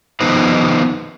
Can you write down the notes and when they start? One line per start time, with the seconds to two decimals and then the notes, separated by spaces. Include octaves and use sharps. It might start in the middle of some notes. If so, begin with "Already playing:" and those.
0.20 D#3 F3 B3 D#4 B4 C5